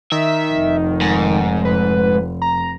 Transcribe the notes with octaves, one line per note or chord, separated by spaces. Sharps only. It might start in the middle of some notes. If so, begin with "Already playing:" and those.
D#3 E5
F1
G#2
B4
A#5